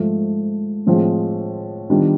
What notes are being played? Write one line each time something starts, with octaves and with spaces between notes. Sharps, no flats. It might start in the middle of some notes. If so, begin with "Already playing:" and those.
Already playing: G#2 F3 A3
A2 F3 G#3 C4
D#3 G3 B3 D4 F4